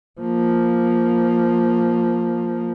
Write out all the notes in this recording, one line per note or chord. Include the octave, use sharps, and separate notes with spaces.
F3 A#3